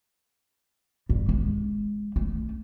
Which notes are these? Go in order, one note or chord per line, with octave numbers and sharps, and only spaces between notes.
G2
G#3
A3